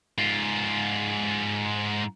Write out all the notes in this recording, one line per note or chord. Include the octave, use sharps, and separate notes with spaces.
G#2 F4